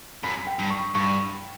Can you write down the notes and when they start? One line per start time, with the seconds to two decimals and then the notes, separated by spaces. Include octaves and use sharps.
0.23 F#2 B5
0.47 G5
0.59 G2
0.70 C#6
0.95 G2 C#6